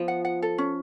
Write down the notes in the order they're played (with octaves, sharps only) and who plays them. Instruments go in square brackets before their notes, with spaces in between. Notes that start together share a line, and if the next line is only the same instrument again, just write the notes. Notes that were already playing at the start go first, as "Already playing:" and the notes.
Already playing: [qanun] F3 B3
[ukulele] F#5
F#5
A4
C#4